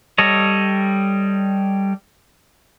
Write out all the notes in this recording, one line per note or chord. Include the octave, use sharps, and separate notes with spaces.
G3 A4 C#5 D#5